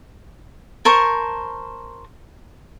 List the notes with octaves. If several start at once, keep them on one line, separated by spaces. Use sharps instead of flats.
A#4 C5 A5 C#6